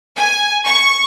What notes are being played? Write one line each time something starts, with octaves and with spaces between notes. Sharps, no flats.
G#5
C#6